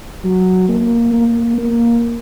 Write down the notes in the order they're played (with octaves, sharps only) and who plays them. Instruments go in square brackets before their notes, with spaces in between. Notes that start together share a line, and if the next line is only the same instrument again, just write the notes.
[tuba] F#3
A#3
A#3
A#3